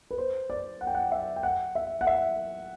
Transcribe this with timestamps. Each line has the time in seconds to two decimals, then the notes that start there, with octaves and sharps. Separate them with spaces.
0.11 B4
0.18 C5
0.50 D5
0.81 F#5
0.87 G5
0.95 F#5
1.12 E5
1.36 G5
1.43 F#5
1.75 E5
2.01 F#5
2.07 E5